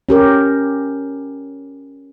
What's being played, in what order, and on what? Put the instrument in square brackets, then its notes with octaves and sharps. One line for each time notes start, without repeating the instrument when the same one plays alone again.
[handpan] C#4 G4 A#4